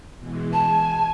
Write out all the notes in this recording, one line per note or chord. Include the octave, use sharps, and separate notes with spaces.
B2 E3 G#3
G#5 A5